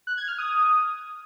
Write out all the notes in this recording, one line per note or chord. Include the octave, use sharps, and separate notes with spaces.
F#6
G#6
F6
D#6